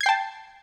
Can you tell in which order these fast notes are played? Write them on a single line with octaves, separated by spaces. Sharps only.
G#6 C7 G5 A5